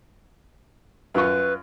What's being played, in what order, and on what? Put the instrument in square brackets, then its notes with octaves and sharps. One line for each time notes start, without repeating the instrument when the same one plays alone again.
[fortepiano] F#2 F4 C#6 [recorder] B4